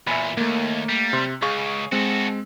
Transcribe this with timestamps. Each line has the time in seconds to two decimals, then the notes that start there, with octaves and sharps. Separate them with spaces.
0.07 E2 A#2 E5 G#5 B5
0.37 D#2 A3 A#3
0.89 G3
1.13 C3 C6
1.42 C#2 G#4 F5 C#6
1.92 G#3 C4 F#4 A4